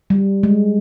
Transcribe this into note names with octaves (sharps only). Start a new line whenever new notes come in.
G3
G#3